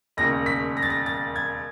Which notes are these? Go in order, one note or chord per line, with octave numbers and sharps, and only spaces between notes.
E1 D#2 C#3 A#6
B6
A#6
A6
A#6
A6
G#6